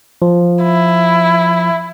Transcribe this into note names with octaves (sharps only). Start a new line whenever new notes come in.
F3
E4